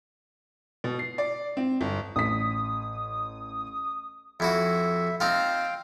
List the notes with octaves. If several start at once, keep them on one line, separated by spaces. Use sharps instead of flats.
B2
C7
D5
C4
G1
A1 D#6 B6
F2 E4 F#4 E5
C4 D#4 F4 F5 G5